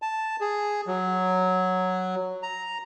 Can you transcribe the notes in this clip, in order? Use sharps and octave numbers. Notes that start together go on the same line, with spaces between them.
A5
G#4
F#3
A#5